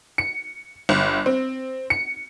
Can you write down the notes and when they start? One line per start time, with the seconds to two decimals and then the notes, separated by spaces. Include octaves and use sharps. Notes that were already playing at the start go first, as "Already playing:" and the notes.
0.18 C#7
0.89 G1
1.26 C4
1.90 C#7